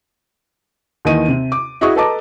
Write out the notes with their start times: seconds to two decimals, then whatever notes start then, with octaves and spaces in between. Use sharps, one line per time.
1.05 D#2 D#3 E3 D#4 D#7
1.28 C3
1.52 D6
1.81 E4 F#4 G#4 D#5 C#6 D#6
1.96 A4 B4 D#5 A5 A#5 D6